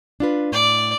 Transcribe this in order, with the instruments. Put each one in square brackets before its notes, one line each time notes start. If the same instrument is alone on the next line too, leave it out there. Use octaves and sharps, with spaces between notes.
[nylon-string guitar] D4 F4 B4
[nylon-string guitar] A2 [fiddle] D5